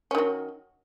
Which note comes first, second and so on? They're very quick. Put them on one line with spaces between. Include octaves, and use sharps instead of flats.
C#4 D#3 F#3